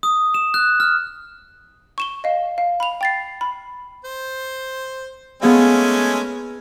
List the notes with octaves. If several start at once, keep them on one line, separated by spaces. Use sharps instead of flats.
D#6
E7
F#6
F6
C#6 E7 G7
D#5 F5
F5
B5 F7
G5 A6 C7
B5
C5
G#3 A3 B3 C#4 G#4 F5